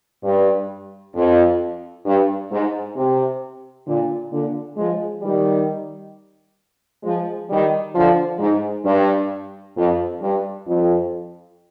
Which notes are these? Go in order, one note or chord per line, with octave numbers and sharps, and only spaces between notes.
G2
F2
G2
G#2
C3
A#2 D3
A#2 D3
F3 G#3
D#3 G3
F3 G#3
D#3 G3
D3 F3
G#2
G2
F2
G2
F2